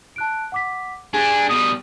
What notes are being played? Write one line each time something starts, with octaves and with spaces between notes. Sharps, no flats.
A5 F#6 D7
F#5 D6 B6
D4 G4 G#4 G#5
B2 G3 D#6